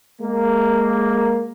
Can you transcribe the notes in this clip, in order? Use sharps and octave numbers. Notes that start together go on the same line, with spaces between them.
G#3 A#3